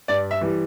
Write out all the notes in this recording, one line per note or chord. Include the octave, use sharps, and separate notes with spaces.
G2 D5
E5
E3 G3